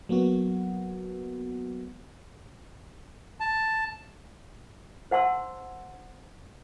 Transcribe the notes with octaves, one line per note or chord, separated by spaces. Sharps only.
F#3 A#3 B3 F#4
A5
C5 F#5 A5 C6 E6